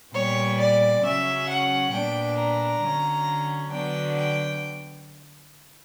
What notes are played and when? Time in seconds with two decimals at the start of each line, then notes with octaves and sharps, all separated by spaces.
0.13 A#2 G3 B3 C#5
0.58 D5
1.03 C#3 F#3 C#4 E5
1.48 F#5
1.92 A#2 G3 B3 D4 G5
2.37 A#5
2.83 D3 F#3 C#4
3.72 D3 F#3 B3 D4 G5
4.17 G5